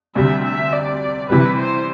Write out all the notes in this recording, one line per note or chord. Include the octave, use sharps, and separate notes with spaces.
D2 C3 G3 E5
E5
D5
C3 E3 G3 B4
C5